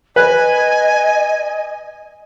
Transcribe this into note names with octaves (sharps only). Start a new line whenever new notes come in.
B4 D#5 G#5